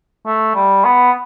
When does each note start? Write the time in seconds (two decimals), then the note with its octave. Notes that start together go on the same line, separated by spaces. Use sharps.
0.26 A3
0.55 G3
0.85 B3